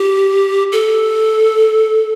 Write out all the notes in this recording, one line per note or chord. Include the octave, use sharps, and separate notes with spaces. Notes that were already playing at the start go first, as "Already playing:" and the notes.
Already playing: G4
A4